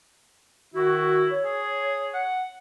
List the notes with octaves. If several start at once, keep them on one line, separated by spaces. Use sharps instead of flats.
D#3 E4 F#4
C#5
G#4
F#5